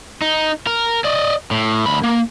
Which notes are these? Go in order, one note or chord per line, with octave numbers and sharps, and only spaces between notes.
D#4
A#4
D5 D#5
A2
D2 B5
A#3